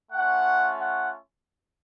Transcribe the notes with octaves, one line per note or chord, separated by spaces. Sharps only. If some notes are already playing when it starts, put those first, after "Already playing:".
A3 C#4 F4 F#5
F#5